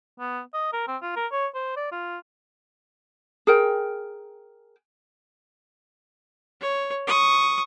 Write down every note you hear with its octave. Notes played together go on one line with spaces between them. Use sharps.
B3
D#5
A#4
C4
F4
A#4
C#5
C5
D5
F4
G#4 A#4 G5
C#5
C#6 D#6